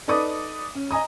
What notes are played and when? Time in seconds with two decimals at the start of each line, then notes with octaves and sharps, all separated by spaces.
0.08 D#4 A4 B4 D5 D6 D#6
0.75 C#4
0.91 D#5 G#5 A#5 D#6